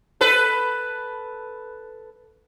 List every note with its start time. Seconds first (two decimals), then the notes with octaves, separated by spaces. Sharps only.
0.21 A4 B4